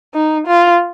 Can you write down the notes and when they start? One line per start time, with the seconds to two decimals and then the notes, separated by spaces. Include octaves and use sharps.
0.15 D#4
0.47 F4